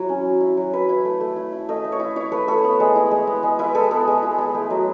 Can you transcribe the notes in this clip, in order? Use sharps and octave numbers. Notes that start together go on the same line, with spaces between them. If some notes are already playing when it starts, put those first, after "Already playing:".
Already playing: F#3 E4 C#5
C#4
F#3
E4
F#3
E4 B4
E4
A3
A3
E4
E4
A3 D#5
A3
C#5
E4
E4 C#5
A3 B4
A3 A4
B3
G#3
E4
G#3
B3
G#3
E4 B4
G#3 A4
B3 A4
G#3
E4
G#3
A3
F#3